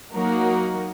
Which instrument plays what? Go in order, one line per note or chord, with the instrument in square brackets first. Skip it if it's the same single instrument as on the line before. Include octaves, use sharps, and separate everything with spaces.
[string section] F#3 A#3 D#4 F#4 A#4